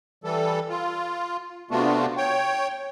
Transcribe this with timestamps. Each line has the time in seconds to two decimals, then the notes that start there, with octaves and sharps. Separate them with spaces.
0.24 E3 G3 A4
0.69 F4
1.71 C3 A3 B3 D4 F4 F#4
2.17 C#5 G5